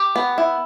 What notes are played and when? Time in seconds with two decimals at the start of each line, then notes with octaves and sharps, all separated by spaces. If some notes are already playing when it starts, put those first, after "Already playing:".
Already playing: G4
0.16 B3
0.38 E4